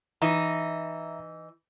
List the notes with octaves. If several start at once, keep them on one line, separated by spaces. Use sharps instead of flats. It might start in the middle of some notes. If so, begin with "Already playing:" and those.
E3 D#4 E5 A#5